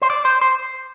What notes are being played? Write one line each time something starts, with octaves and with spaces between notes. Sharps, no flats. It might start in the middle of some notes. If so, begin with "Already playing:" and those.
C5
D5
C5
C5